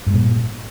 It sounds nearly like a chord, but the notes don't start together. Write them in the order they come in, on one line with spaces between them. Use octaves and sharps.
G2 G#3 A#2